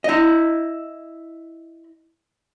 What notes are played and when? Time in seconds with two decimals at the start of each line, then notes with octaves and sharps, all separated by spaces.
0.04 E4 D#5